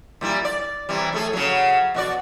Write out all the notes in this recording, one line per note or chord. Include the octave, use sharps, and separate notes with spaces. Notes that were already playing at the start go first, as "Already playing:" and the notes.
A#2 G3 E4
D5
C3 E3 G3
A2 A3 G#4
C#3 F#3
B2 F#4 D5